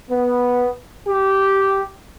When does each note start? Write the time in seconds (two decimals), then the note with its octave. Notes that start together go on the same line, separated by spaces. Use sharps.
0.10 B3
1.07 G4